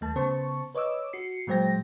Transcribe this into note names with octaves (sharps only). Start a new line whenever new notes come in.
D#2 A3 A5
C#3 B3 C5 A5 C#6
B4 C#5 D#5 D6 E6
F#4 C7 C#7
A#2 F#3 G#3 C5 G5 A#6